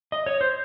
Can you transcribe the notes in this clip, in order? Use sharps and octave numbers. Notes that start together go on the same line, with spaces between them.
D#5
C#5
C5